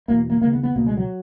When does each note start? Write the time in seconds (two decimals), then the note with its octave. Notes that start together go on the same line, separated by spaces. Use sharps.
0.08 E2 B2 A#3
0.30 A#3
0.41 D#2 C#3 A#3
0.53 B3
0.63 B3
0.75 C#2 B2 A#3
0.87 G#3
0.97 F#3